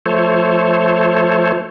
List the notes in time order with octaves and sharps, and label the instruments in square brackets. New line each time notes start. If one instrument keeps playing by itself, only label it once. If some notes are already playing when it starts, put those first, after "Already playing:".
[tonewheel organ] F3 A3 A4 C5 C#5